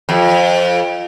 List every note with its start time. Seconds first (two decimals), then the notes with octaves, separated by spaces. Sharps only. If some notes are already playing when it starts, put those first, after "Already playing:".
0.09 F2